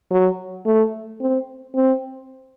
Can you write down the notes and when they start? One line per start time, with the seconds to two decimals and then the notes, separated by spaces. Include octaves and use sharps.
0.11 F#3
0.66 A3
1.21 C4
1.75 C4